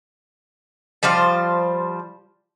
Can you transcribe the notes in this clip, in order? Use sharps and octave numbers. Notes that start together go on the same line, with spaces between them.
F3 G3 C5 F5